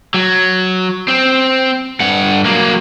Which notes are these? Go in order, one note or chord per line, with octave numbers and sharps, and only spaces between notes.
F#3
C4
G2 F#5
F#3 A#3